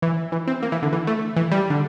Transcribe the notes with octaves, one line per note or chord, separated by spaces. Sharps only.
E3
E3
C4
A#3
E3
D3
E3
A3
E3
G3
D3